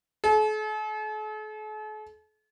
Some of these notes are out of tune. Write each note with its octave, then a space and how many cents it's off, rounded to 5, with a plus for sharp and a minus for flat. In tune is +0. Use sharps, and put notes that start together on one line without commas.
A4 -45